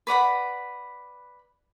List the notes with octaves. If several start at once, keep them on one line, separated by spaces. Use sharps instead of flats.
B4 D5 F#5 B5